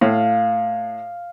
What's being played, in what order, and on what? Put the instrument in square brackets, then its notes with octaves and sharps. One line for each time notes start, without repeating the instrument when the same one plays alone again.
[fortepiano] A2 [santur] F5